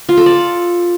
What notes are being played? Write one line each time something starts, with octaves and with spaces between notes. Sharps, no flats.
F4
A4
D5